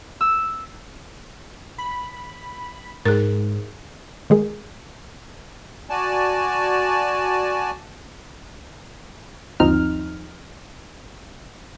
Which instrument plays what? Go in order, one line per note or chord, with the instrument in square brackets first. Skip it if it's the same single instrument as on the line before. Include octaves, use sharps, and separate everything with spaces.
[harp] E6
[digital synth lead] B5
[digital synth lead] G#2 [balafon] G#4 A#4
[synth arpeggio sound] D#3 G#3 G#4 A#4
[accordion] F#4 D5 G#5 A5
[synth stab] G1 D#2 F3 C4 D#4 F6